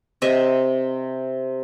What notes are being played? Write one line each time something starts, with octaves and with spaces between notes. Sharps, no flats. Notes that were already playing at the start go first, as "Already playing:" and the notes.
C3 D#5 E5